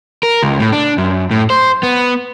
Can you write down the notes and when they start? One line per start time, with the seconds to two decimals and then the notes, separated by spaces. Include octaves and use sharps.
0.23 A#4
0.43 C#2
0.60 A2
0.73 D4
0.98 F#2
1.31 A2
1.50 C5
1.83 B3